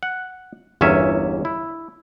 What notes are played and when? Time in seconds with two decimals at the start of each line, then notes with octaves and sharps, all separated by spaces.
0.03 F#5
0.81 G1 E2 A#3 C#4 E5
1.45 E4